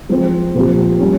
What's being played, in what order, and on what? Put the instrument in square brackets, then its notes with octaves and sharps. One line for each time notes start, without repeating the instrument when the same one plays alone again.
[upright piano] F3 G#3 C4
A#2 F3 C4 G4
G3 C#4